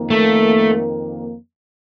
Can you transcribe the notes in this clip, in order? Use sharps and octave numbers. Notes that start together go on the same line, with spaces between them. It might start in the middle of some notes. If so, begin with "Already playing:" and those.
Already playing: F2 D#3 A#3
A3